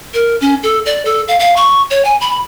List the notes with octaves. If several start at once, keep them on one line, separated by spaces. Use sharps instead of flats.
A#4
C#4
A4
D5
A4
F5
F5
C#6
C#5
G#5
B5